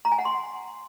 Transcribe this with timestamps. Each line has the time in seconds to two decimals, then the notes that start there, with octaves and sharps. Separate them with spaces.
0.05 A#5
0.12 G#5
0.19 F#5
0.25 C6